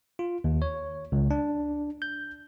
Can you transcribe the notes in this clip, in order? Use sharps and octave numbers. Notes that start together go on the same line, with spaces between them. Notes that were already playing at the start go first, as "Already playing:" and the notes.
F4
D#2
C#5
C#2
D4
G6